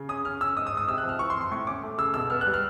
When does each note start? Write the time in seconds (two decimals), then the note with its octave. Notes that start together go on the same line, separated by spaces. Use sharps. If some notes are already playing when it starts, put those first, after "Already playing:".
Already playing: C#3
0.09 C#4 D#6
0.24 C#4 F6
0.41 C#4 E6
0.57 G#2 D#6
0.67 D#6
0.72 G#2
0.77 D#6
0.88 C3 E6
0.98 F#6
1.03 F3
1.09 F6
1.19 E3 C#6
1.30 C6
1.35 F2
1.41 C6
1.51 A2 C#6
1.67 C#4 D6
1.83 A3
1.98 C#3 E6
2.14 B2 E6
2.30 B3 F6
2.41 F#6
2.46 G3
2.54 F6